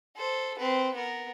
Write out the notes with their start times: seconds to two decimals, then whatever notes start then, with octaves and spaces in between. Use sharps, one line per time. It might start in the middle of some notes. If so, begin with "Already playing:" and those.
0.16 A4 C5
0.58 C4 B4
0.94 B3 A#4